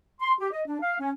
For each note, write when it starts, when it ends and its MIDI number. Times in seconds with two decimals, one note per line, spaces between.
0.21 0.33 84
0.41 0.51 67
0.53 0.62 75
0.67 0.82 62
0.82 0.96 77
1.01 1.12 61